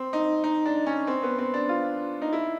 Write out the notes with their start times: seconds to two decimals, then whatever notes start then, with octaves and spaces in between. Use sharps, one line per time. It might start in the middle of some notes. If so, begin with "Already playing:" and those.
Already playing: C4
0.13 D#4
0.44 D#4
0.65 D4
0.86 C#4
1.07 C4
1.23 B3
1.39 C4
1.54 D4
1.69 F4
2.22 D#4
2.33 E4